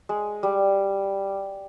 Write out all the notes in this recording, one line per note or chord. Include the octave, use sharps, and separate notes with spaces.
G#3
G3